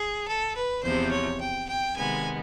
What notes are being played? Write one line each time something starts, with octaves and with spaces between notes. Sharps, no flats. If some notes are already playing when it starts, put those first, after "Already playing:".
Already playing: G#4
A4
B4
E2 C3 F3 C5
C#5
G5
G5
C3 D#3 G#3 B3 G#5